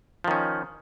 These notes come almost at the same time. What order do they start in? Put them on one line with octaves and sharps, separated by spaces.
F3 D#3 C#4